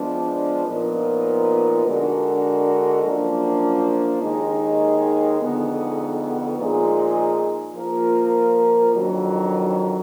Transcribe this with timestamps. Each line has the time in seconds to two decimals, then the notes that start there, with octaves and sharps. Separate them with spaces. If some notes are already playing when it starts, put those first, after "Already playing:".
Already playing: F3 G#3 B3 D4
0.67 A#2 F3 B3 D#4 A#4
1.86 D3 G#3 D4 F#4 A#4
3.03 F#2 F3 A#3 D4
4.22 D#2 D#3 G#3 D#4
5.40 F2 D3 G#3 B3 D#4
6.57 A#2 F3 G#3 D#4 G#4
7.75 F3 A#3 F4 A#4
8.94 F2 D#3 F#3 D4